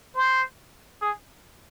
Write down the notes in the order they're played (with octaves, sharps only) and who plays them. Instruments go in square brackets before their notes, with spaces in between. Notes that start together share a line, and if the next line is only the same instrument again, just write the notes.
[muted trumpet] C5
G#4